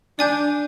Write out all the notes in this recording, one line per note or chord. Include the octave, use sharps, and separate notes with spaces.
D4 D5 G#5 D6 G6